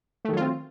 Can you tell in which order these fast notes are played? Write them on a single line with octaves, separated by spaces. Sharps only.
A3 D#3 F#3 F4 C4